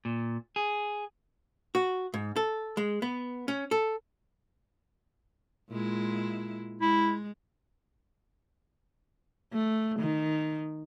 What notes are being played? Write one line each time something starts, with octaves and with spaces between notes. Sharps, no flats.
A#2
G#4
F#4
G#2
A4
G#3
B3
C#4
A4
A#2 G#3 E4
G#3 E4
A3
D#3